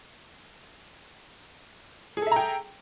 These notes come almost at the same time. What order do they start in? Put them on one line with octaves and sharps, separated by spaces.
G#4 A4 E5 A#5 G5